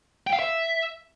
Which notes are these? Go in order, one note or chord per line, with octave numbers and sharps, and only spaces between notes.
G5
F5
E5